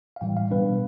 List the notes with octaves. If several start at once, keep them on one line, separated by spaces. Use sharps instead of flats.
F5
A2 E3 G3 G5
F5
B2 G3 B3 D4 B4